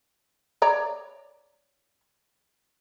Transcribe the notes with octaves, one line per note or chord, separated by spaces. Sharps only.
C#5 D5 A#5